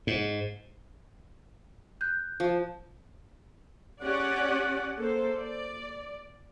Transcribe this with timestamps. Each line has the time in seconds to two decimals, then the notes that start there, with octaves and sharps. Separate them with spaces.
0.07 G#2
2.01 F#6 G6
2.40 F3
4.02 C#4 G4 D5 F#5
4.97 A#3 A4 C5
5.38 D5